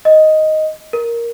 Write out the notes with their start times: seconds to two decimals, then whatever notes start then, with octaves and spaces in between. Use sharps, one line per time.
0.05 D#5
0.93 A#4